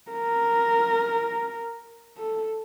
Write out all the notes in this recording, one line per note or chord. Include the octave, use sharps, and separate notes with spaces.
A#4
A4